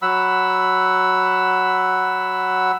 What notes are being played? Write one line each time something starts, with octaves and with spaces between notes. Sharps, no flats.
F#3 F#5 B5 E6